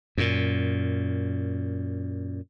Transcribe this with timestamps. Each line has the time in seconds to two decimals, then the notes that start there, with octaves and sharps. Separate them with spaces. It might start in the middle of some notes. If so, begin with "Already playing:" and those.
0.18 F#2 A#2